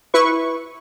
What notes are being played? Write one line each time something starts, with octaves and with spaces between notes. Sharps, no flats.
E4 B4 C#6